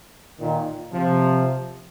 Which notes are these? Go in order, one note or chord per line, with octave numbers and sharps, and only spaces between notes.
A#2 D#3
C3 F3